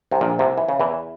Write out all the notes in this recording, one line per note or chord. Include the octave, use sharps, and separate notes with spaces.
C2 C3
A#1 A#2
C2 C3
E3
C#3
E2 E3